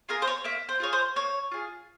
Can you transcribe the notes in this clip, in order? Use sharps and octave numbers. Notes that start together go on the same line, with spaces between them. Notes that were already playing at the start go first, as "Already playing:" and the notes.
F4 G#4 A#4
C5
C#5
A#3 E5
C5
F4 G#4 C#5
C5
A#3 C#5
F4 G#4